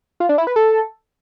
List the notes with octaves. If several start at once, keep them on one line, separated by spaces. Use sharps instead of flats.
F4
D4
E4
B4
A4